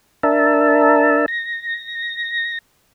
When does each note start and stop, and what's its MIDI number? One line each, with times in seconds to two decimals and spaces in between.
0.23 1.26 62
0.23 1.26 70
0.23 1.26 76
0.23 1.26 81
1.28 2.58 94